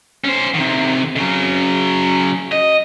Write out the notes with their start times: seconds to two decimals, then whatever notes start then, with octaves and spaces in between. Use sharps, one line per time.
0.24 C#4 C5
0.54 C3 D#3
1.16 C#3 F#3
2.52 D#5